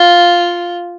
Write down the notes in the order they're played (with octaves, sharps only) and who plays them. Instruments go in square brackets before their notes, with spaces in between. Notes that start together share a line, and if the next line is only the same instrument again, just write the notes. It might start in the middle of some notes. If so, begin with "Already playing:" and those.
Already playing: [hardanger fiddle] F4